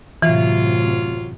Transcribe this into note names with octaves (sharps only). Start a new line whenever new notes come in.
F#2 A2 C3 E3 F#3 F4